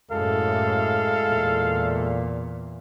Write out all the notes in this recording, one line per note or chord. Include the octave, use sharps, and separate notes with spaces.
F#2 A2 G#3 E4 A4 F5
E2 A#2